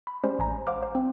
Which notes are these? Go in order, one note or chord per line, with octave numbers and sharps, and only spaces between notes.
B5
G#3 C#4 G4 C5 D5
A1 G#5 A#5
C5 F5 F#5 D6 F6
C5
C4